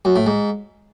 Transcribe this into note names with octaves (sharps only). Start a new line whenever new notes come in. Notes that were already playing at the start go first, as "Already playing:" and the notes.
F#2
A2
G#2